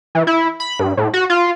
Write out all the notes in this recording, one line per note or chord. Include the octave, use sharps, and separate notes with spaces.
E3
E4
B5
G2
A2
F#4
F4